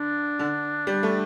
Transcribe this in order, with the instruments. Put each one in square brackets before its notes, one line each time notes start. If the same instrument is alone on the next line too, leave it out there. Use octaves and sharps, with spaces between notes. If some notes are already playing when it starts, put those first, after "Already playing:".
Already playing: [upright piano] D3 [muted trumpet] D4
[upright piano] D3
G3
A3